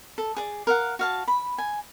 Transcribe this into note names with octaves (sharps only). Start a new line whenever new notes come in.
A4
G#4 D5
A#4 F5 F#5
F#4 F5 A5
B5
G#5